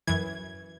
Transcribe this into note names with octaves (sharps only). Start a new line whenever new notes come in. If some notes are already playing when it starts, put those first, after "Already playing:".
F#2 E3 G#6